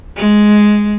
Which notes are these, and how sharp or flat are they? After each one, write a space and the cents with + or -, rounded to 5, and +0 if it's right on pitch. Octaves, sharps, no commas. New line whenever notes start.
G#3 +5